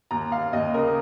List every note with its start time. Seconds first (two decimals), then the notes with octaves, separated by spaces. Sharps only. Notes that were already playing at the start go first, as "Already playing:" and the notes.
0.11 D#2 A#5
0.31 D#2 F5
0.53 D#2 D#5
0.74 C#3 A#4